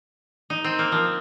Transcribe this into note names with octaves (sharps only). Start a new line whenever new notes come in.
D#4
C4
A#3
F3